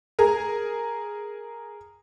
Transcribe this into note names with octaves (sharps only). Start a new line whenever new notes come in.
G#4 A#4